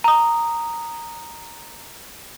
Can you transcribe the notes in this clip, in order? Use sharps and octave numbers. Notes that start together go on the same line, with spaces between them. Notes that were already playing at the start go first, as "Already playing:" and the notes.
A#5 D#6